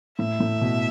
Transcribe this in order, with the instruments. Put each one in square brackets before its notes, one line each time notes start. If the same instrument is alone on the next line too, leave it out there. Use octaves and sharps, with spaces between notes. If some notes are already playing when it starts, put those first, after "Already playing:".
[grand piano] A2 [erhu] E5
[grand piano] A2
B2